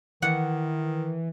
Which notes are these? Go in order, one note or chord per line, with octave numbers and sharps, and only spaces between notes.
D#3 E3 F#5